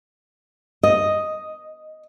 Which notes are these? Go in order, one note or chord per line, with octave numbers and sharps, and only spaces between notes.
D#5